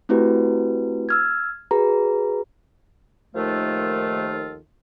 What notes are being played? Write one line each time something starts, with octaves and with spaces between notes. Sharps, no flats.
A3 C4 E4 F#4 G4 B4
E6 F6 G#6
F#4 G#4 B4 A#5
D#2 D#3 F3 A3 F4 A4